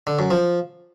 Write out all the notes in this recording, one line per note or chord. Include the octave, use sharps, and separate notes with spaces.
D3
F#2
F3